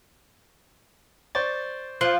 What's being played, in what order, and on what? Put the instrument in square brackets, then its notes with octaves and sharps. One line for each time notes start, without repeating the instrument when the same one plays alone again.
[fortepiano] C5 D5 C#6 [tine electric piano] A6
[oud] F3 [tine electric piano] C6 F#6